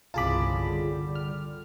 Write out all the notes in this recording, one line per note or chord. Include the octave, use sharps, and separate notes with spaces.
G1 C2 C#3 F4 G#4 A5 B5 D6
D3 G3
F6